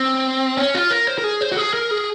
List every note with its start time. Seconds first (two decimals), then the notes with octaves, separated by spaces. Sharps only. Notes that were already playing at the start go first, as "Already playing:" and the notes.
Already playing: C4
0.57 C#4
0.75 F4
0.91 A#4
1.07 C5
1.18 A#4
1.24 G#4
1.41 C5
1.52 F#4
1.57 G#4
1.74 A#4
1.91 G#4